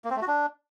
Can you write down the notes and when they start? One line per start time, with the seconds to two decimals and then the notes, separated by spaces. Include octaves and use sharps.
0.04 A#3
0.10 C4
0.16 A3
0.22 F#4
0.28 D4